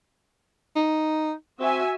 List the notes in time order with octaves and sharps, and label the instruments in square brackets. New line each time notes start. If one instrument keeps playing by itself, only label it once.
[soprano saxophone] D#4
[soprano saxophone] C4 [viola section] F#4 E5 G#5